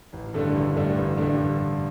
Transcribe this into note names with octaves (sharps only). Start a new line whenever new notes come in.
A1
G2 D3 A3 D4
A1
G2 D3 A3 D4
A1
G2 D3 A3 D4